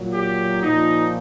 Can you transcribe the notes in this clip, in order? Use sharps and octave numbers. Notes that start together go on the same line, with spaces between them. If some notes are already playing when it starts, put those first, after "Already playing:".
Already playing: A#2 F#3
G4
A#2 F3 D#4